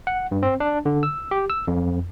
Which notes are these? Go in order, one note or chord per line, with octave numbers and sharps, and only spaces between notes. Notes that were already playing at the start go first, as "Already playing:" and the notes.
F#5
G2
C4
D4
D3
E6
G4
E6
F2